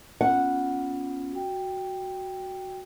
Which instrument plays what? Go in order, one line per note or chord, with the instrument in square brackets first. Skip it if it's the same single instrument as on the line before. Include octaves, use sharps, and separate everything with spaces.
[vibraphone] B3 C#4 F4 [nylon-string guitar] F#5
[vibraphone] F#4 G5